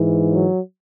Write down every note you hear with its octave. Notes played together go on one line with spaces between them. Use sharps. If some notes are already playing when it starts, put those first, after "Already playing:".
Already playing: G#2 E3
F#3